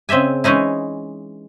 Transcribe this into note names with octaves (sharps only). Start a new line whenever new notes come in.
C#3 C4 D#5 E5 G#5
E3 G#3 C#4 D#4 E4